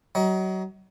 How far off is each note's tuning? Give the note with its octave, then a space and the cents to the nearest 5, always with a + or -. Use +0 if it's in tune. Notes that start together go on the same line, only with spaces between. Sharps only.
F#3 +30 D#5 +35